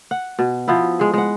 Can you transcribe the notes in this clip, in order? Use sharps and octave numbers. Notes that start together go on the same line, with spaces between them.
F#5
B2
F3 B3 E4
G#3 G#4
G#3 F#5